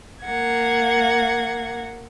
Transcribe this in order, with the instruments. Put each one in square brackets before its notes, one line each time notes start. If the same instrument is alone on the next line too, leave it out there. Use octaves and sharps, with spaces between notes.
[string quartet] A#3 F#5 G#6